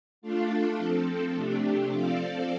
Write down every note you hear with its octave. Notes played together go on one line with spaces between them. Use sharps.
A3 D4 F4 A4 F5
F3 C4 A4
C3 A3 D4 G4
F3 C4 A4 D5 F5